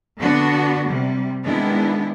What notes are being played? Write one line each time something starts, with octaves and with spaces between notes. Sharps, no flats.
D3 B3 D4 F#4
C3 G3
D#3 G#3 B3 D4 E4